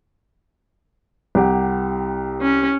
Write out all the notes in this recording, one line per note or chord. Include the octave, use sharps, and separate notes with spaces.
C2 G4 F#5
C#4